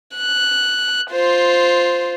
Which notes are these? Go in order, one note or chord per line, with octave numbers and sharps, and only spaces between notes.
F#6
F4 C5